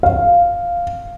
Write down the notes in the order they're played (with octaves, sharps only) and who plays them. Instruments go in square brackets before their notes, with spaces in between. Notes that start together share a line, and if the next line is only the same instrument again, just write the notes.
[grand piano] F5